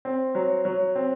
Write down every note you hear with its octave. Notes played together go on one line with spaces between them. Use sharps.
C4
F#3
F#3
C4